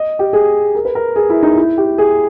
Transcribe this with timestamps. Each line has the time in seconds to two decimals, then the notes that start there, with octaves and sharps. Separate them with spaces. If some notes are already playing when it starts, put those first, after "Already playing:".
Already playing: D#5
0.19 G4
0.33 G#4
0.75 A#4
0.85 B4
0.95 A#4
1.16 G#4
1.30 E4
1.43 D#4
1.57 E4
1.78 G4
1.98 G#4